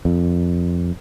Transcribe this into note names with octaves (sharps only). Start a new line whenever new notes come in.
F2